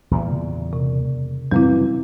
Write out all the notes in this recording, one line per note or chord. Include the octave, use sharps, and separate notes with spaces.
E2 A#2 G3
C#3
C3
F#2 A#2 E3 G3 C4 E4